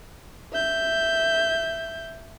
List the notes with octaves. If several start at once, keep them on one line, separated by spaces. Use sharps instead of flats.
E5 G6